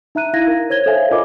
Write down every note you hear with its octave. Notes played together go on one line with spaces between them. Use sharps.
D#4 E5 A#5 F#6 D#7
E4 F5 G#6 A#6
A#4
C5 C#5 G#6 G7
A4 C5 C#5 E5 F5 G#5
F4 A#4 D#5 G#5 D6